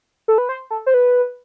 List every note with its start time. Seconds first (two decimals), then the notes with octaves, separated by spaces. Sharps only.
0.28 A4
0.38 B4
0.49 C5
0.71 A4
0.86 C5
0.94 B4